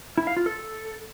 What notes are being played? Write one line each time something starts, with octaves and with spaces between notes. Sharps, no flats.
E4
F5
F4
A4